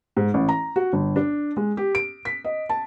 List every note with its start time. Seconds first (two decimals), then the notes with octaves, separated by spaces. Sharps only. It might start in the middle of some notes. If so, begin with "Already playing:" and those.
0.17 G#2
0.34 A1
0.49 A#5
0.76 F#4
0.93 G1
1.16 D4
1.57 G#3
1.77 G4
1.95 D7
2.25 B6
2.44 D#5
2.69 A5